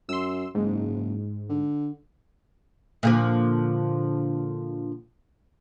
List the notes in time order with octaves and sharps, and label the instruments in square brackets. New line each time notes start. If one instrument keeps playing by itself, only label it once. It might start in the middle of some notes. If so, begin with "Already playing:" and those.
[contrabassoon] F#2 [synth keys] C6 E6
[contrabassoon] F#1 [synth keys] G#2
[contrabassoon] D3
[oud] A#2 D3 F3